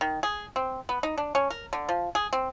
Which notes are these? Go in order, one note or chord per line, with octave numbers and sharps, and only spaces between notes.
D#3
G#4
C4
B3
D#4
D4
C#4
A#4
D3
F3
G#4
C4